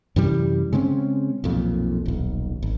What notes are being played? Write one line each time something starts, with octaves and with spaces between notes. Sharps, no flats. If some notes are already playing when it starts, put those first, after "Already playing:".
F#2 C3 E3 G3
C#3 G#3 C4 C#4
B1 F2 A#2
D#1 B1
G#1